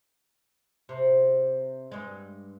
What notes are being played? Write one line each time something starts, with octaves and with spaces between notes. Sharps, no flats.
C3
G2 G#3